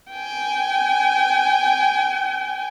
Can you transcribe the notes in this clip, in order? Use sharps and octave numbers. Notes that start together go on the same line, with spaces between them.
G5 G#5